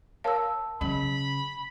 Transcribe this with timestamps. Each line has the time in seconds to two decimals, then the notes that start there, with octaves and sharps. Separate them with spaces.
0.24 A#4 C#5 F5 A5 E6
0.81 C#3 F#3 B5